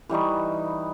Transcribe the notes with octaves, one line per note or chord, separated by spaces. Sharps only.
E3 G3 D#4 C#6